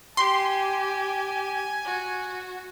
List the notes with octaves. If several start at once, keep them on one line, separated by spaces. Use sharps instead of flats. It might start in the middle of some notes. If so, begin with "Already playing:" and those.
G4 G#5 C6
F#4